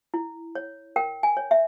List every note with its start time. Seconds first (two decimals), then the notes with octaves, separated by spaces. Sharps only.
0.14 E4
0.55 C#5
0.96 A#4 G5
1.23 G#5
1.37 C#5
1.51 E5